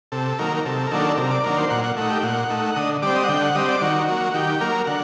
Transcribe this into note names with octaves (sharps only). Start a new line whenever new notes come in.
C3 A4
D#3 F#3 A#3 A#4
A#4
C3 A4
A#4
D#3 F#3 A#3 D4 A4
C3 A#4
D5
D#3 F#3 A#3 D4 A#4
C5
A#2 F#5
F#5
A3 D#4 F#5
G4
A#2 F#5
A3 D#4
D3 D#5
G3 C4 D5
D#5
F#5
D3 G5
F#5
G3 C4 D#5
D5
D#3 F#4
F#3 A#3
D#3 G4
F#3 A#3 A#4
D3 F#5